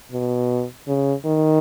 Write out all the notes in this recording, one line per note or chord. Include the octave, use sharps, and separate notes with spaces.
B2
C#3
D#3